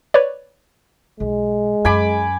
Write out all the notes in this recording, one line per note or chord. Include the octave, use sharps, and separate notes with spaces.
B4 C#5 D5
B1 G#3
F#2 G#5 B5 D6